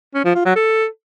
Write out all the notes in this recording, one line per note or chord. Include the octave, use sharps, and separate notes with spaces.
C#4
F3
F4
F#3
A4